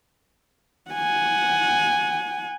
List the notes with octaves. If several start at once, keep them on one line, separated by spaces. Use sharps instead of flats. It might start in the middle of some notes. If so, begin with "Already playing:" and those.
F#5 G#5